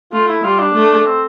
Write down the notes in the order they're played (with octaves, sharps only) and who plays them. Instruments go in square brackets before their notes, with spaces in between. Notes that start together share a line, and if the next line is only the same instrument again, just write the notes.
[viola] A3 [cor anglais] F4
[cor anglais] E4
[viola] G3 [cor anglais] F4
[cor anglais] D4
[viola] A3
[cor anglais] C4